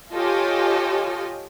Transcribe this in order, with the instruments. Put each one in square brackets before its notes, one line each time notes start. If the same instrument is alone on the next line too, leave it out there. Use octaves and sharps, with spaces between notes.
[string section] F4 G4 A4 C#5 D#5 G#5